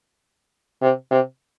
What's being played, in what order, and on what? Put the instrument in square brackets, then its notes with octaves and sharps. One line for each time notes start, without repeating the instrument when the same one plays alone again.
[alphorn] C3
C3